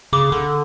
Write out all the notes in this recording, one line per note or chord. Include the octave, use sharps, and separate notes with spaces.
C#3 D6
D3